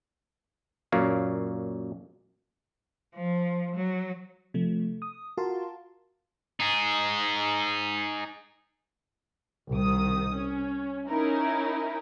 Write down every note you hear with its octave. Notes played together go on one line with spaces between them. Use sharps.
F#2 A#2 A#3 C#5 F5
F3
F#3
C3 F3 A3
D#6
F4 F#4 A#4 F5 A5 C6
D#4 G#4
C2 D#3 D#6
C#4
C#4 D#4 E4 A#4